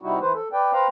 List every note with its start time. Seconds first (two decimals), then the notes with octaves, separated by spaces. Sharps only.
0.02 C3 G3 D#4 E4 F#4
0.21 E3 B4 C5
0.34 A4
0.53 B4 D5 G5
0.73 B4 C5 F5 G5 A#5